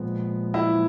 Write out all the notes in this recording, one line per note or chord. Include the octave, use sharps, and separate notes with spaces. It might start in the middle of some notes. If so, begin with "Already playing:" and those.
Already playing: A#2 F3 G#3 B3
E4